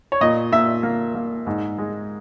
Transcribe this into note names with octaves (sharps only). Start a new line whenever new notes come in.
C#5
A#2 D#5
A#2 E5
A#3
A#3
G#2
G#3